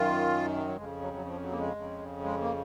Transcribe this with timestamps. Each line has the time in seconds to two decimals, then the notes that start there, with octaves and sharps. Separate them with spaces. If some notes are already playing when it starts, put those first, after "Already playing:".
Already playing: F#2 D#3 F4
0.67 F#3
0.76 F2 C#3 G#3
1.01 F#3
1.14 F#3
1.25 F3
1.42 F#3
1.51 A#3
1.59 G#3
1.75 F2 C#3
2.24 G#3
2.41 A#3